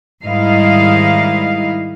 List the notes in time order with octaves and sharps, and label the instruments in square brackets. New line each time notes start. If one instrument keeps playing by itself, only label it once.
[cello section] G#2 D#3 G3 E4 D#5 F5